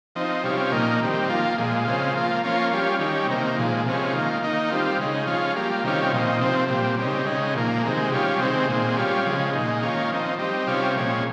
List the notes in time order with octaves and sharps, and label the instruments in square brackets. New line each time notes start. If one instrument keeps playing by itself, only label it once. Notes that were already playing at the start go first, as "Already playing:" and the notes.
[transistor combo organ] F3 C4 D#4
C3 G3 C#4 F4
A#2 F3 A#3 D#4
D#3 G3 C4
F3 A#3 F4
A#2 F3 G#3
C#3 G#3 C4 F4
F3 A#3 F4
F3 A#3 C#4 F4
G3 C#4 F4
D#3 G3 C#4
C3 D#3 A#3
A#2 F3 G#3
C3 F3 G#3 C#4
D#3 A#3 F4
D#3 A#3 D#4
G3 C4 F4
C#3 G#3 D#4
F3 G#3 C#4 F4
G3 A#3 F4
C3 D#3 G3 C#4 F4
A#2 F3 C4 D#4
C3 F3 C4
A#2 G3 C4
C#3 G3 C4 D#4
C#3 G#3 D#4
A#2 F3 A#3
C3 D#3 G#3
G3 C#4 F4
C3 D#3 G#3 C4
A#2 G#3 C4
G3 C#4 F4
C#3 F3 G#3
A#2 G#3 D#4
D#3 A#3 C#4 F4
F3 C4 D#4
G3 C4 D#4
C3 G3 C#4 F4
A#2 F3 G#3 C#4